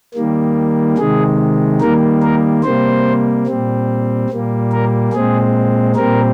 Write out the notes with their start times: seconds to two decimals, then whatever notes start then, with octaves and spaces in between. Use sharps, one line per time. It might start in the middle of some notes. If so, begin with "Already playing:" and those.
0.14 D#3 G3 A#3
0.98 C3 D#3 G#3 G#4
1.81 D#3 G3 A#3 A#4
2.22 A#4
2.63 C3 G3 A#3 C5
3.47 A#2 G3 C4
4.30 A#2 G3 A#3
4.72 A#4
5.13 A#2 G#3 C4 G#4
5.96 A#2 G3 C4 A#4